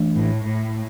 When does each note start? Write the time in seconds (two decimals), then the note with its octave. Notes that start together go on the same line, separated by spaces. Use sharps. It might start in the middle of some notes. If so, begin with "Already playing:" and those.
Already playing: E3 A3 D4
0.17 A2
0.48 A2